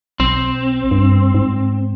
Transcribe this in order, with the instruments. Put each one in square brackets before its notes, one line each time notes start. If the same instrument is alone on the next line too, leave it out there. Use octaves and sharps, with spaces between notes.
[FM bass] B1 [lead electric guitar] C4
[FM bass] G2
G#2